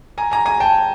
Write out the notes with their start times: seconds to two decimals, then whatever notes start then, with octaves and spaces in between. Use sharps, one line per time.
0.18 G#5 A#5
0.32 G#5 A#5
0.46 G#5 A#5
0.60 G5 A5